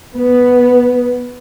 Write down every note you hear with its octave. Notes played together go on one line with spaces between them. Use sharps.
B3